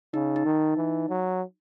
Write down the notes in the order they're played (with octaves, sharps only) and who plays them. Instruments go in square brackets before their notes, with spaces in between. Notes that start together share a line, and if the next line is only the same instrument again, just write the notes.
[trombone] C#3 [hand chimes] D#4
[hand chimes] D#4
[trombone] D#3
E3
F#3